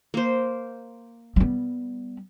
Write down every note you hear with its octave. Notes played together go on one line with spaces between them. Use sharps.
A#3 C5
G3 B3